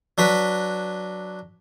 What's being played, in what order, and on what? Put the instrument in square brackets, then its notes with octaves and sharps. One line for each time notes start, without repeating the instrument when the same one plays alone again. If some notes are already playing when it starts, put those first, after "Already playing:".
[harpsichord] F#3 D4 F#4 B4